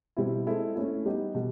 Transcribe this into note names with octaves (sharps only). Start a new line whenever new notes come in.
B2 G3 C4 E4
G#3 C4 E4 A4
A3 C#4 E4
G3 B3 D#4 G4
B2 G3